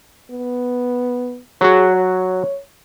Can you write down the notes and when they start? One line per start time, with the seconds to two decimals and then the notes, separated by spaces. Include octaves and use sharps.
0.31 B3
1.61 F#3 F#4 G#4
1.94 C#5